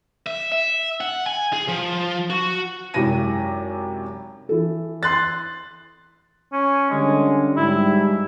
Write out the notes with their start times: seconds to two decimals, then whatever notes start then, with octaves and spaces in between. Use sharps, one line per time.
0.26 E5
0.52 E5
1.01 F#5
1.26 G#5
1.53 G#4
1.68 F3
2.30 F#4
2.94 G#1 F#2 C3 E4 A#6 D#7
4.49 E3 A4
5.03 C6 F#6 A6
6.52 C#4
6.90 D3 G3 G#3 C#4
7.57 G#2 G3 E4